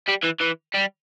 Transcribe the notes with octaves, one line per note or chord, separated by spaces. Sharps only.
G3
E3
E3
G3